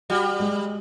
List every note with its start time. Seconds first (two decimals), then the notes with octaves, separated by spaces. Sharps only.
0.10 G3 F#4
0.40 G#3